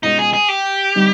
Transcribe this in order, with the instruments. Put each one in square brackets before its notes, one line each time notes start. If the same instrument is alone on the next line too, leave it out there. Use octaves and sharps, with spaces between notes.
[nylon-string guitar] B2 G#3 C#4 F4 [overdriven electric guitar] D#4
[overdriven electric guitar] G#4
G#4
G4
[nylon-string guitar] D3 G3 C4 D#4